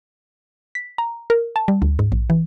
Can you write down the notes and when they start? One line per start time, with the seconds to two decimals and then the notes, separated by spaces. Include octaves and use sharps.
0.75 B6
0.98 A#5
1.30 A#4
1.56 A5
1.68 G3
1.82 D2
1.99 G#2
2.12 A#1
2.30 E3